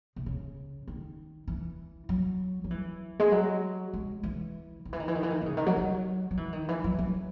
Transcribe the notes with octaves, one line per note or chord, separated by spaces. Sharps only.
C3
C#3
D#3
E3
F#3
F#3
E3
G#3
F#3
G#3
E3
D#3
E3
D#3
E3
D#3
E3
D#3
D#3
C#3
D#3
F#3
F#3
F#3
E3
D#3
E3
F#3
F#3